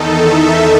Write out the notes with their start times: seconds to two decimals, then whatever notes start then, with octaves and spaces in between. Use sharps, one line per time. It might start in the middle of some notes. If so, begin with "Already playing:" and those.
Already playing: E2 D#3 D#4 A4
0.14 E5